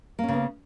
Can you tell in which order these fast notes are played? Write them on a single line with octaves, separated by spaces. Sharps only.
A#3 C#4 C#3 B3